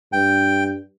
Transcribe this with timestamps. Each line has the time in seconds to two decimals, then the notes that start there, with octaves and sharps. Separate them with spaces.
0.13 G2 G5